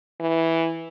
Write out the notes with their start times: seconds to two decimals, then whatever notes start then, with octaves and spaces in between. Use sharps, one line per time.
0.20 E3